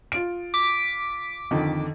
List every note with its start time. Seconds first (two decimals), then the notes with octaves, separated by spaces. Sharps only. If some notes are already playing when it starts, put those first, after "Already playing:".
0.12 F4 D7
0.54 D6 B6
1.51 F2 D3 D#3